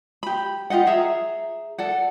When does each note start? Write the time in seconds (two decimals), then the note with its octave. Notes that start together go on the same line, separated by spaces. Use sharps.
0.23 G4 B5
0.70 F4 G4 D#5 F#5
0.87 G#4 E5 A#5
1.78 A4 D5 F#5